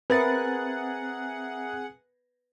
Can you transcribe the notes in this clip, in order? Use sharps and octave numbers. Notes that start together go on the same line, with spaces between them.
C4 G#4 A#4 B4 E5 F#5 A#5 A6